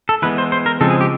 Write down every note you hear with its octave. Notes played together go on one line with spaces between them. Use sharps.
A4
E3 G#3 B3 B4
C5
C5
A#4
C#3 F3 G#3 C4 A4
G#4
G4